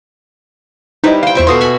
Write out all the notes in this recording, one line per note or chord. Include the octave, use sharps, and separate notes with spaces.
G3 D#4 E4 B4 C5 D#5
C5 F5 G5
E2 F4 C5 E5 C#6 D7
B2 F#4 A4 C6 D#6 C7
E5 G#5 B5